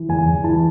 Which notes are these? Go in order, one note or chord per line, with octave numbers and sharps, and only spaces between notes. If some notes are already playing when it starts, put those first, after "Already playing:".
Already playing: E3
E2 G#5
E2
E3 A5